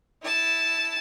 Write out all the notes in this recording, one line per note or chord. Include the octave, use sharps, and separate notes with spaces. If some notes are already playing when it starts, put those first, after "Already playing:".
E4 A5